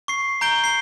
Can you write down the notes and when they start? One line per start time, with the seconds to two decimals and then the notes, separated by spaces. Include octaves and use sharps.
0.08 C#6 C7
0.41 A#5 G6 D7 G7
0.64 C7 G7